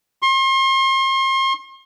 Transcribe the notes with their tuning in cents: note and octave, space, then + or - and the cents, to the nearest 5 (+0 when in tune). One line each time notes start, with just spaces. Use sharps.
C6 +40